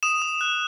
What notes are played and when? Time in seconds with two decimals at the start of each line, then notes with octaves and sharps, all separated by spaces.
0.03 D#6 E7
0.22 D#6
0.41 F#6